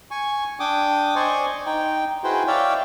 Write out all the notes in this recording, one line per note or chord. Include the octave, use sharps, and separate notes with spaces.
G#5 C#6
D4 G5 D6 D#6
C5 D5 D#5 G#5 C#6
D#4 G5
E4 F#4 G#4 B4 C5 G5
C#5 D5 E5 F5 G5